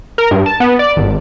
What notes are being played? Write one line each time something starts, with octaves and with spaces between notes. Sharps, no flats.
A#4
G2
A5
B3
D5
G#1